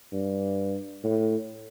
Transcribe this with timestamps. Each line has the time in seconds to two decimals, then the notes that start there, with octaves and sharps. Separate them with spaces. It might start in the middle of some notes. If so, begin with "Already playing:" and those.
0.13 G2
1.04 A2